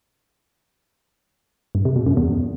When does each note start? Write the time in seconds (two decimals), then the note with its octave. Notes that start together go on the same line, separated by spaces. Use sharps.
1.75 G2
1.85 C3
1.96 B2
2.06 F#2
2.17 E2